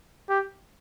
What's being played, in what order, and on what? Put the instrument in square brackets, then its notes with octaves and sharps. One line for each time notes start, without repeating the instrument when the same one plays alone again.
[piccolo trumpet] G4